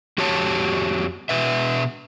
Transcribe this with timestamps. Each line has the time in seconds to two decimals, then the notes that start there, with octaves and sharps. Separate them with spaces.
0.18 F2 F#4 G4 C#5 A5
1.29 B2 B4 E5